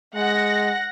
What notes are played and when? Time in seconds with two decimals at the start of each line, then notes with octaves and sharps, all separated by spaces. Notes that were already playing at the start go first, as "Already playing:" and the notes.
0.15 G#3 F#5 A#6